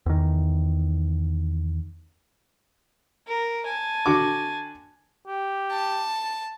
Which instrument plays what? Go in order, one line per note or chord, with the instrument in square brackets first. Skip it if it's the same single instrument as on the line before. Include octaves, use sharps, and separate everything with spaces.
[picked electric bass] E2 D#3
[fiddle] A#4
G#5 A5
[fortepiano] D3 F#4 D6
[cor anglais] G4
[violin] A5